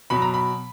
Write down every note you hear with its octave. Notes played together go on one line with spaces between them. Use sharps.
B2 F#3 B5
A#5
B5